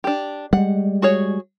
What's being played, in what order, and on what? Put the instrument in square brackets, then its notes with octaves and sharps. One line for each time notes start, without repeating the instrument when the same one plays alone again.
[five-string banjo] D4 G4
[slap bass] G3 G#3 [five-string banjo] F#5
[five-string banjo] F#4 G#4 C#5